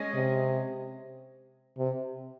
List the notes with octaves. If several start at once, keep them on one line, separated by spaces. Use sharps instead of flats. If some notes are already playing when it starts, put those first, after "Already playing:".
Already playing: G#3 C#4 G#4 D#5
C3
C3